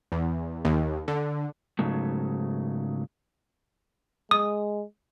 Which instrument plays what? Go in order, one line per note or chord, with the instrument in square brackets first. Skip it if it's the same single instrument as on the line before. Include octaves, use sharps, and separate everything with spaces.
[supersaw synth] E2
D#2
D3
[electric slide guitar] G#2 C#3 F#3 A3
[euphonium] G#3 [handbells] D#6